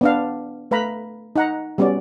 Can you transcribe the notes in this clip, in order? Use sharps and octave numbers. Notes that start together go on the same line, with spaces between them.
B3 D4 F5
A3 B4 F5 A#5 B5
D#4 F#5 A#5
G3 B3 C#4 F#4 D5